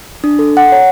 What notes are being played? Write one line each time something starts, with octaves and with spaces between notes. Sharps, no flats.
D4
A4
F#5
C#5